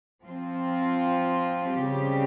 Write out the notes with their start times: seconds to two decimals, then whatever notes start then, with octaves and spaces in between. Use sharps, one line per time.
0.24 F3 C4 F4
1.73 C#3 G3 C4 G4